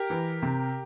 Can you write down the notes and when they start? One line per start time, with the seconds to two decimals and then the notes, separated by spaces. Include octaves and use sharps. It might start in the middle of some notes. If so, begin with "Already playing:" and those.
Already playing: G4 A#4
0.10 E3
0.42 C3